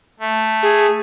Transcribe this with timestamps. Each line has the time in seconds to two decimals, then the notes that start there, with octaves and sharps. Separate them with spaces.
0.19 A3
0.63 G#4